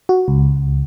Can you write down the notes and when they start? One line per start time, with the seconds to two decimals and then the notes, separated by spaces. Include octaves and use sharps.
0.09 F#4
0.28 C#2